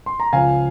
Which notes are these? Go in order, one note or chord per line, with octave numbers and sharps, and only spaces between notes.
C6
A#5
C#2 C#3 F3 F5 G#5